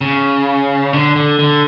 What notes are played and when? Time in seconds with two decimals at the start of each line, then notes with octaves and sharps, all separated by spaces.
0.01 C#3
0.93 D3
1.16 D3
1.39 D3